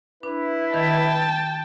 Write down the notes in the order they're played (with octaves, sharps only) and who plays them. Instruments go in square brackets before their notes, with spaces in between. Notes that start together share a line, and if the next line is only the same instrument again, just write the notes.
[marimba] D4 [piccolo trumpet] E4 [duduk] B4
[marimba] D#3 [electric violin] G5 A5